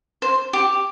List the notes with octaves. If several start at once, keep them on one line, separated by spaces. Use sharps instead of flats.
C5
G4